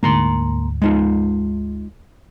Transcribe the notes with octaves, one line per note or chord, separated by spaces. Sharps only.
D2 G#2 A#3 A#5 C6
G#3 D#4 F4